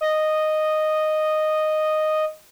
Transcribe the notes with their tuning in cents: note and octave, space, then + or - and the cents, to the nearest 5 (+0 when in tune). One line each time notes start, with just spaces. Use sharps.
D#5 -5